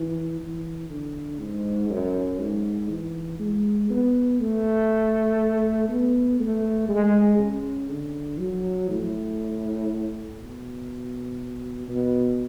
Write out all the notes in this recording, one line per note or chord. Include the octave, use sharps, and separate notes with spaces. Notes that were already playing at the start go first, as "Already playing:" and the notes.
Already playing: E3
E3
D3
G#2
F#2
G#2
E3
G#3
B3
A3
B3
A3
G#3
C#3
D3
F#3
A2
B2
B2